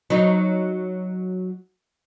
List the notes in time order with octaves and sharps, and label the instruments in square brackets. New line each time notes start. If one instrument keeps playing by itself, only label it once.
[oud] F#3 D#4